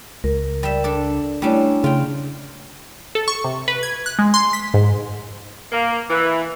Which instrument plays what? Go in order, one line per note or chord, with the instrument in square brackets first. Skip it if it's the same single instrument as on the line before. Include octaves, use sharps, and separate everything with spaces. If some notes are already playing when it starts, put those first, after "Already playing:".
[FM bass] C#2 [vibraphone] A#4
[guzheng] G3 E5
D4 A4
[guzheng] G3 C#4 D4 [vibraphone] A3 E4 C#5
[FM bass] C#3 [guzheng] F4 G5
[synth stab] A4
C#6
C3
B4
G#6
F#6
G#3
C6
B6
G#2
[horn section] A#3
E3